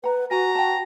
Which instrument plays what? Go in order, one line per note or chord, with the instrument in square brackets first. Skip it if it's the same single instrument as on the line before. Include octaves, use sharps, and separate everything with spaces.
[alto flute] B4 [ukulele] F#5 A#5
[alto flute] F#4 [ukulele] G#5 [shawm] A#5
[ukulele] G5 A5